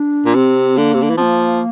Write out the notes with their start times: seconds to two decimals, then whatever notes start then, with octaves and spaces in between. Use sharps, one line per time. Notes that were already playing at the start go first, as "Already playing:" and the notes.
Already playing: D4
0.26 A#2
0.35 C3 C4
0.77 D3 A#3
0.93 C3
1.02 D3
1.10 E3
1.17 F3 C4
1.22 A#3